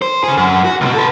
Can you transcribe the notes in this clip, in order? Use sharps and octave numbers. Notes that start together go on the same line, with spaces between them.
C5
C#3 G#4
F#2
F#4
C#2 B2
A4 B4